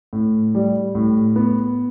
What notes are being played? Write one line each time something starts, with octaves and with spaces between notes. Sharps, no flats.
A2
G3
A2
B3